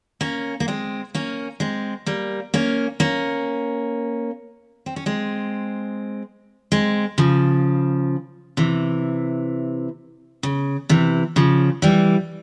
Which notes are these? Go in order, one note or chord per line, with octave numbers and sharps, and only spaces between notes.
A#3 C#4
A#3
G#3 C4
A#3 C#4
G#3 C4
G3 A#3
A#3 C#4
A#3 C#4
C4
C#4
G#3 C4
G#3 C4
C#3 F3
C3 E3
C#3
C3 E3
C#3 F3
E3 G3